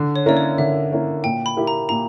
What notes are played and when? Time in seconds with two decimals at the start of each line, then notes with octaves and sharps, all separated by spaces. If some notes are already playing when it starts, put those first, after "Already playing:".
Already playing: D3
0.16 C#5
0.26 A#3 C#4 E4 A#4 D5
0.37 C#5
0.58 D3 E5
0.92 A#3 C#4 E4 A#4
1.24 A#2 G5
1.46 B5
1.57 A#3 E4 G4
1.67 A#5
1.89 A#2 A#5